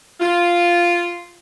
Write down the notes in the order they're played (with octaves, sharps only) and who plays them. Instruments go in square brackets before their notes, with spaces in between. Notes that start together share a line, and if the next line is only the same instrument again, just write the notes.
[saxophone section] F4